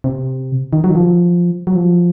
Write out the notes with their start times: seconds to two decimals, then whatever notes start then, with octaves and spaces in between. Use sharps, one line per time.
0.04 C3
0.73 D#3
0.84 F#3
0.90 D#3
0.95 F3
1.67 F#3
1.75 F3